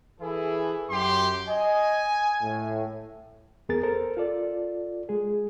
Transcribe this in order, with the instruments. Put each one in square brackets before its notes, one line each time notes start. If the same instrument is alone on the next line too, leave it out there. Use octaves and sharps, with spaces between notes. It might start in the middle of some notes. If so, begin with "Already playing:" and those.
[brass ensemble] E3 A4 [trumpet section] E4 G#4
[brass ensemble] F#2 [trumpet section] G4 C6
[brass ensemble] D#5 [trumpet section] G#5
[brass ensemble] A2
[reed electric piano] E2 B3 G#4 A#4 A6
A4 A#4 C5
F4 A4 D5
G#3 G#4